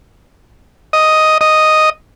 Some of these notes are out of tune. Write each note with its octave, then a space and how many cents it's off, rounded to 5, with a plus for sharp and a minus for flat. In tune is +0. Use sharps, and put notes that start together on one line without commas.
D#5 +5
D#5 +0